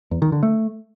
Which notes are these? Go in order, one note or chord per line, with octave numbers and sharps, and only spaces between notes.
E2
D#3
D3
A3